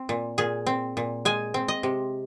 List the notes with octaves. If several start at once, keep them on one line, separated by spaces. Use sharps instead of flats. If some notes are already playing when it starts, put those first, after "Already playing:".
Already playing: C4
A#2
A#2 G#4
C4
A#2
G#3 G#5
C4
D#5
C3